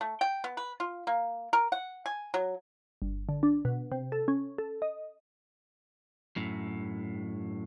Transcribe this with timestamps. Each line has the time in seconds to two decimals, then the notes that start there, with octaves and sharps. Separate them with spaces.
0.01 A3
0.21 G5
0.44 B3
0.57 B4
0.80 F4
1.07 A#3
1.53 A#4
1.72 F#5
2.06 G#5
2.34 F#3
3.02 G1
3.29 D3
3.43 D4
3.65 B2
3.92 C3
4.12 A4
4.28 C#4
4.58 A4
4.82 D#5
6.36 F#2 A2